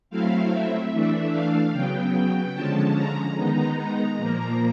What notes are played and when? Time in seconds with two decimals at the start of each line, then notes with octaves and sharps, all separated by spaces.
0.10 F#3 A3 C4 E4 F5
0.51 E5
0.92 E3 A3 D4
1.33 F5
1.73 C#3 F#3 B3 G5
2.54 D3 F3 G#3 C#4 A5
2.95 A#5
3.36 D#3 G#3 B3 D#4 A#5
4.17 A#2 F3 A#3